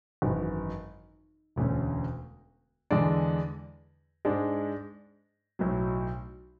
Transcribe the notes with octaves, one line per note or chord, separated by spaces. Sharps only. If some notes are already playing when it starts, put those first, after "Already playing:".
G#1 F#2 E3
E1 D2 D3 A3 C#4
E2 D3 G#3 D4
G#2 G#3 D4
B1 A2 F#3